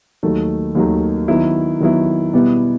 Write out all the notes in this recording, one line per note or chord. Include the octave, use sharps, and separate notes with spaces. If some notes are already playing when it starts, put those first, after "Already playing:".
D#2 D#3 F#3 A3
D#2 D#3 F#3 A3
D#3 F#3 B3 E4
D#3 F#3 B3 E4
B2 G3 B3 E4